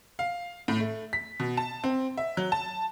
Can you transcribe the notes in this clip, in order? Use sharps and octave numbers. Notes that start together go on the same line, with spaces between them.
F5
A2
A3
B6
B2
A5
C4
E5
F#3
A5